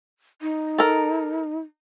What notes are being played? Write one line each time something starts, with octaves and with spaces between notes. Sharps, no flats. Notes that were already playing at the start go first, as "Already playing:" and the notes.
D#4
A4 A#4